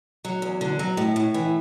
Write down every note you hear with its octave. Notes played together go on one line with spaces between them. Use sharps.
F#3
E2
D3
F#3
A2
A2
E3